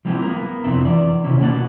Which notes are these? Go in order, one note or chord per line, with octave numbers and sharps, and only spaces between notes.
F3 G3 C4 E4 F#4 G4
B3 A#4
F2 C3 C4 D4 E4
E3 D5
C3 D#3 C#4 E4
B2 A#3 F#5 A5